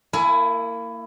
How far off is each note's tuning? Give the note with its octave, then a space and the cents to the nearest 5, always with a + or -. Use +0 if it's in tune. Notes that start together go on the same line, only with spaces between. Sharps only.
A#3 -25 E4 +15 G#5 +20